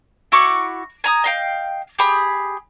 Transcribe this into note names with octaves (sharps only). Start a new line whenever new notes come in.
E4 F#4 C#6 D6
G#5 A#5 D#6
D#5 F5 G5
G4 G#4 B5 D#6